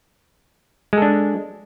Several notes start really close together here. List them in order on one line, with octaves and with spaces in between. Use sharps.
G#3 A4 D4